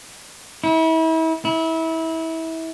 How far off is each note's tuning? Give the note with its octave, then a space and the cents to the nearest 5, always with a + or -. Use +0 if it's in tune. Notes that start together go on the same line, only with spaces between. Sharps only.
E4 -35
E4 -25